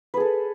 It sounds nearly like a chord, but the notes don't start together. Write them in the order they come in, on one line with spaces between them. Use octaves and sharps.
B4 G#4 A4